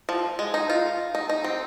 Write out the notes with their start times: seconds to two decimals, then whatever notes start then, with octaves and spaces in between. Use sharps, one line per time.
0.09 F3
0.39 G#3
0.54 D#4
0.70 F4
1.15 D#4
1.29 D#4
1.44 C4